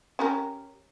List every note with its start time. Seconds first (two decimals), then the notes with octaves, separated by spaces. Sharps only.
0.19 C#4 G4 A#4